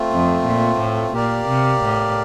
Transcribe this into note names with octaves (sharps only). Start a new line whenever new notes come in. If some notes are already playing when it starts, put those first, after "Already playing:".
Already playing: A3 C4 F4
F2
A#2
A2
A#2 G4 A#4 D5 F5
C3
A2